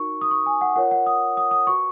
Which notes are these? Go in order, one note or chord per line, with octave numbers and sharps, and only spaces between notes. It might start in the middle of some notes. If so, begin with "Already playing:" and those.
Already playing: D#4 F#4 A#4 C#6
D#6
C#6
G#5
F#5
F4 A#4 C#5 F#5
F#5
D#6
D#6
D#6
F#4 B4 C#6